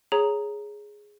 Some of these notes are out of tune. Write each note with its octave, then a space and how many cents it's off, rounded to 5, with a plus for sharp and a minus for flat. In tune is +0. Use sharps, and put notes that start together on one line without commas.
G#4 +0 C#5 +0 A#5 +0